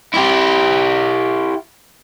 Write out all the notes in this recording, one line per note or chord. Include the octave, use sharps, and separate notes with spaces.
E4 G4